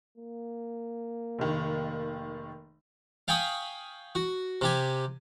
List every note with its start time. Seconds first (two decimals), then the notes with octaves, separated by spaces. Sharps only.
0.18 A#3
1.39 F1 D#3
3.28 F5 G5 G#5 B5 C#6 D#6
4.15 F#4
4.61 C3 G4 G#5